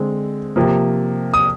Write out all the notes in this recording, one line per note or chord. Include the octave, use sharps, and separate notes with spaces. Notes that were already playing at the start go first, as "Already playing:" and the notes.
Already playing: D3 G#3 C4
C3 F3 A#3
D#6